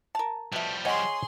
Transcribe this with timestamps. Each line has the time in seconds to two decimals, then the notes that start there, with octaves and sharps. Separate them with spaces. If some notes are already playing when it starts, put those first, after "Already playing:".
0.15 A#4 A5
0.52 B2 F3 G3 A3
0.85 G#4 C#5 D#5 F#5 G#5 C6